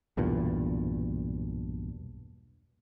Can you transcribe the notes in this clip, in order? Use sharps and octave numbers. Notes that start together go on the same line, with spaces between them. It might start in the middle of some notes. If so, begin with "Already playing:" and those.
B1 E2 G2 A#2